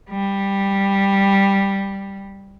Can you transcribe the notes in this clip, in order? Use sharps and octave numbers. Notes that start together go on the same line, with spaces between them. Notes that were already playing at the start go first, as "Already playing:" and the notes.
G3